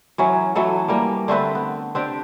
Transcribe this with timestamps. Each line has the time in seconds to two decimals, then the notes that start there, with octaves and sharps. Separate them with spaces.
0.18 E3 F#3 C#4
0.55 E3 F#3 A3 A4
0.88 G3 A#3
1.28 D3 A3 C4 B4
1.55 B3
1.95 C4 D4 G4